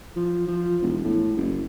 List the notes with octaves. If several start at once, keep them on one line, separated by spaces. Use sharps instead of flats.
F3
F3
E1
A2
F#1